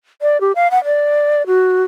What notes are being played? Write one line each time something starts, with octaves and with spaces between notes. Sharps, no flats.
D5
G4
F5
F#5
D5
F#4